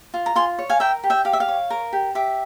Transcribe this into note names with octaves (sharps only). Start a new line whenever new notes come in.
F4
A#5
F4 G#5 C6
C#5
F5 G#5
A#4 E5 G5
G4
E5 G5
G4 F5
E5
F5
C#5
A#4
G4
G4 E5